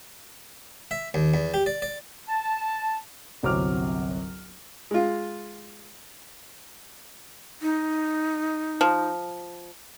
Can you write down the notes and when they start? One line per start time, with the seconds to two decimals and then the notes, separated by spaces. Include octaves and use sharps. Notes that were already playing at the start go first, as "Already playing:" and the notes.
0.91 E5
1.14 D#2
1.34 E2
1.54 G4
1.66 D5
1.82 D5
2.28 A5
3.43 G1 C2 F#3 C4 D6 F6
4.91 G#3 F4
7.62 D#4
8.81 F3